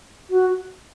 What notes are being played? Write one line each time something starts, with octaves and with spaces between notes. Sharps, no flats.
F#4